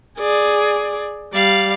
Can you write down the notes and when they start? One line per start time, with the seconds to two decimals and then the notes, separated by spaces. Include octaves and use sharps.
0.18 G#4 D5
1.33 G3 D5 F5